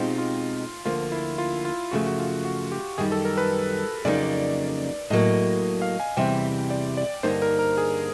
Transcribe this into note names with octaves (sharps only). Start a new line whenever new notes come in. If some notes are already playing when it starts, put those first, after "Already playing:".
Already playing: B2 G#3 C4 D#4 F4 G4
F4
D2 D3 F3 A#3 F4
E4
F4
F4
F#2 C#3 F3 A3 F#4
F#4
F4
F#4
G4
F#2 D#3 G3 G#4
A4
A#4
B4
F2 C#3 F#3 A#3 D#4 D5
A2 F#3 A#3 D#5
F5
G#5
E2 C3 E3 G3 G5
D5
D5
G2 D3 G3 A#3 D#4 C5
A#4
A#4
G#4